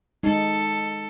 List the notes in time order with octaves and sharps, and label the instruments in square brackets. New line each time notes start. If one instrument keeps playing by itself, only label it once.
[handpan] G#3 D#4 [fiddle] A4